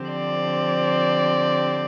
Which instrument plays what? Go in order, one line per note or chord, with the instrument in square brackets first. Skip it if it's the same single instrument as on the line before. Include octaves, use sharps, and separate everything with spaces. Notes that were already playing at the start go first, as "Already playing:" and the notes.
Already playing: [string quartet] D3 F3 C4 G4 C5
[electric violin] D5